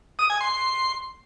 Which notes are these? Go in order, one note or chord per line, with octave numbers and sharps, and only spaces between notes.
D#6
G#5
C6